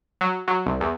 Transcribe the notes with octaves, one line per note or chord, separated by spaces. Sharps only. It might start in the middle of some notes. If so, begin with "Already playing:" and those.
F#3
F#3
C2
E2